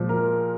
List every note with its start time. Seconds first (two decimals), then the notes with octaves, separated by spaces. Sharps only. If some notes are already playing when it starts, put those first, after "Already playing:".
Already playing: A#2 F3 G#3
0.09 A#4